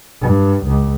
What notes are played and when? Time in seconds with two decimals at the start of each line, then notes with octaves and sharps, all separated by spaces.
0.21 G2
0.66 C#2